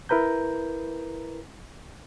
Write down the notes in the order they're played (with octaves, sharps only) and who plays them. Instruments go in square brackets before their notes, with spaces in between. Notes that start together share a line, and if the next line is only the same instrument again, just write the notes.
[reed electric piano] E4 A#4 B4 A#5 G6